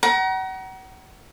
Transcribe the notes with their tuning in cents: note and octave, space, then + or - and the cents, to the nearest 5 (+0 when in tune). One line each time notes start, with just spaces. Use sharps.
F#5 +35 A#5 +30